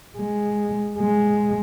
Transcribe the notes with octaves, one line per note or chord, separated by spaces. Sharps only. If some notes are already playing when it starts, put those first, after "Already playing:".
G#3
G#3